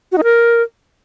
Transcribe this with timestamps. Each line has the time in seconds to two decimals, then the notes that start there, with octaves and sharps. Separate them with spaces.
0.12 F#4
0.18 D#4
0.24 A#4